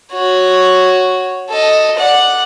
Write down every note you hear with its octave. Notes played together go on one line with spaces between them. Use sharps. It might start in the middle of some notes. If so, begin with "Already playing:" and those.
F#4 C#5
A4 D#5
D5 F#5